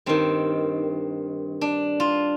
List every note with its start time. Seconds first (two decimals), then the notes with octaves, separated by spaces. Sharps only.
0.06 G2 D#3 C4
1.61 D4
2.00 F4